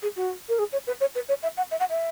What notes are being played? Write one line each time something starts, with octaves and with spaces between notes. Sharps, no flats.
G#4
F#4
A#4
G#4
C#5
B4
C#5
B4
C#5
E5
F#5
E5
F#5
E5